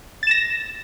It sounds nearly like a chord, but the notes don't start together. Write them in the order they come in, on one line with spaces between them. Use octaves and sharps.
A6 E7 A#6